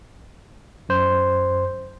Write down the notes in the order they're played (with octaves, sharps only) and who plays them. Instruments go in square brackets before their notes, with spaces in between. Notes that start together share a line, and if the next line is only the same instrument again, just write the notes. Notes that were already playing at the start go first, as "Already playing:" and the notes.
[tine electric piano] F#2 C5